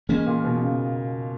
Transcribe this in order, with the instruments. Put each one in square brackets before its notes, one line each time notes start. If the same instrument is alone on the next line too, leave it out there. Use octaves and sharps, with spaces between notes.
[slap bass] E3 A#3 C#4 [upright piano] G#3
[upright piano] A#2
B2
C#3